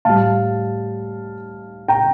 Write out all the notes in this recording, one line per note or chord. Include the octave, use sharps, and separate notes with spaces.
A2 G3 F5 A5
G5 A#5